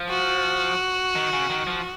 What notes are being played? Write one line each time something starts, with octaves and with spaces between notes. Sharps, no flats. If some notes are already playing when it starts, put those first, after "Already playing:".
Already playing: F3
F#4
D#3
C#3
D#3
F3